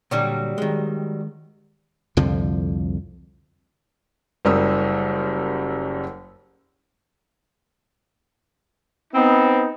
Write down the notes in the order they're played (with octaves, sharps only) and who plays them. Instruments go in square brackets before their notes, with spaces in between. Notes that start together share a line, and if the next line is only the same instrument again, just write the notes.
[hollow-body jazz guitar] A#2 D3 [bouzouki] F#3 G3
[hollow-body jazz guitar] D#3 G#3
[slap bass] C2 F2 D3 F3
[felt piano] F#1 F#2 G3 A#4 D#6 E6
[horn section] B3 C4 D#4